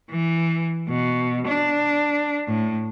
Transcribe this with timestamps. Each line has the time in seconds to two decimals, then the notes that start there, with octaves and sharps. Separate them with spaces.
0.10 E3
0.89 B2
1.47 D4
2.48 A2